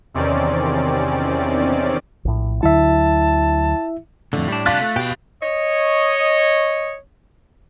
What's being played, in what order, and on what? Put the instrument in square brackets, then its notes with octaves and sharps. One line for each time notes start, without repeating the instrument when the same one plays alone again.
[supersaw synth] E2 C3 D#3 C4 C#4 D5
[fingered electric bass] A#1 A2
[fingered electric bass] D2 D3 F#3 [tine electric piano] E4 E5 [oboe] A5
[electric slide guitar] F2 D3 [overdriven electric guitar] A2
[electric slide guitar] G3 D4
[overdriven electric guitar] C3 A5 [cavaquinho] F4 [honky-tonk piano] F#6 A6 B6
[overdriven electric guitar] A3
[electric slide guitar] B2 G5 [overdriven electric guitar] G4 F5
[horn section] C#5 D#5